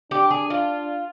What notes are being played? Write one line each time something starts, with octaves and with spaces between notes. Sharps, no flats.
D4 G4
G#4
F4